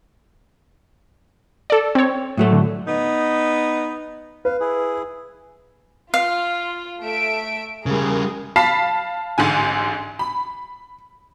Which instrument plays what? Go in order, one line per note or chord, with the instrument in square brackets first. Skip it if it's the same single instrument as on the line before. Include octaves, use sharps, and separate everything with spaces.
[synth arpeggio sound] A4 D5
C4 C#5
[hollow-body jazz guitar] A2 F#3 A3
[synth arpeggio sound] D3
[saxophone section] B3 D#4
[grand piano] B4 [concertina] F5
[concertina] E4 G#4
[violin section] F4 [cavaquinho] F5
[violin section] A3 E5 D7
[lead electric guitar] C#3 G3 [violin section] G#4 A#4
[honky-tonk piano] F5 A5 B5 B6 C7
A1 G#2 D3 G#5
B5